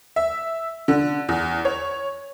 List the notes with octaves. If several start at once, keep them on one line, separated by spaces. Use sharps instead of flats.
E5
D3
E2
C#5